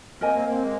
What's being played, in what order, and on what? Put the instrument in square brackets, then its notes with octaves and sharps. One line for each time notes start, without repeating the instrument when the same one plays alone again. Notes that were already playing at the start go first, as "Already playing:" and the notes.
[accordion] A#3 C4 [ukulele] A#4 D#5 G#5
[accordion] A#3 C4
A#3 C4
G#3 A#3